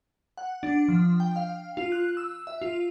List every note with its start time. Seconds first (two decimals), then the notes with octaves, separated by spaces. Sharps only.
0.38 F#5
0.63 D4
0.88 F3
1.20 G5
1.36 F5
1.77 F4
1.92 F#6
2.17 E6
2.47 E5
2.62 F4